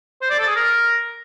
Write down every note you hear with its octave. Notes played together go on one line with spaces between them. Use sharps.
C5
D5
A4
G#4
A#4